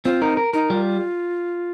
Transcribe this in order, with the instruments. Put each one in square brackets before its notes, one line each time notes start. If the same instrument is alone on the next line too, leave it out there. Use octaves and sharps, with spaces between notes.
[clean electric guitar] C4 [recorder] F4
[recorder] D#4 [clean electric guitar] A#4
[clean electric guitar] A#4
[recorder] D#4 [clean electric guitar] A#4
[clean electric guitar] G3 [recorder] F4